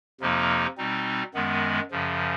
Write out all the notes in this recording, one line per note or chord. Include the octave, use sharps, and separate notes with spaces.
F2 C3 F3 A#3 D#4
B2 G3 C4 D#4
F#2 D#3 G#3 B3
F#2 C#3 F3